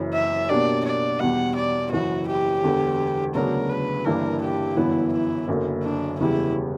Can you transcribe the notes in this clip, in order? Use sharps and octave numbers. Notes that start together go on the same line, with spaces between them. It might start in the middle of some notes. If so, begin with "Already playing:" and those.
Already playing: F#1 F#2 E3
E5
B2 A#3 D4 G4 D5
D5
E2 B2 G3 F#5
D5
F#1 F#2 E3 F#4
G4
E1 E2 D3
D2 C#3 F#3 B3 D4 A#4
B4
G1 G2 E3 A#3 D4 A#4
G4
G1 F#2 E3 B3 E4
E4
F#1 F#2 D3 A#3
D4
E1 E2 C#3 G3 E4